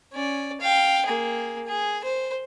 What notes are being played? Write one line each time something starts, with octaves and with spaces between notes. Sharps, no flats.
C#4 D5
F5 G5
A#3 G#4
G#4
C5